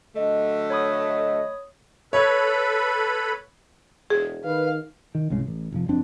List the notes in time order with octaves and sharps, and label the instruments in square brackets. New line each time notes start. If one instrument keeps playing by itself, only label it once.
[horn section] D3 F#3 A3 [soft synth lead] D#5
[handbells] C#5 B5 D#6
[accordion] A4 B4 B5 [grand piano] C#5
[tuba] E1 [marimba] G#4
[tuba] D#3 [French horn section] B4 [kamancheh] F5
[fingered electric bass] D#3
C2 G#2 C#3 G#3
A1
F1 F3
F#1 F2 C4 D4